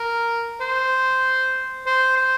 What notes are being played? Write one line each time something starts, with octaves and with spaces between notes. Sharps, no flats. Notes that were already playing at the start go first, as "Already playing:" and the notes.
Already playing: A#4
C5
C5
C5